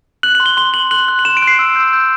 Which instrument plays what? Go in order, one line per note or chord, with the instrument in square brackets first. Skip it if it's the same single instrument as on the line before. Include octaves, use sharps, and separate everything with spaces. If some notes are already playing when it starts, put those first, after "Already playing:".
[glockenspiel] F#6 F#7
C6 F#7
G7
C6 G7
C6 F#7
F#6 F#7
F#6
F#7
C6 E7
D7
F#6
C7
E6
G6
G6